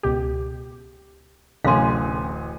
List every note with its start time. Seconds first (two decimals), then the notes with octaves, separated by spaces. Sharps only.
0.03 C#2 B2 G4
1.64 D1 A1 C3 C#4 F5 G#5 C6